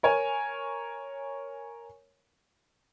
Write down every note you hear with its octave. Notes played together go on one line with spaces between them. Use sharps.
A#4 C#5 G#5